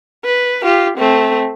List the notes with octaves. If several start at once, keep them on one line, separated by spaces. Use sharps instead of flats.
B4
F4 G4
A3 C4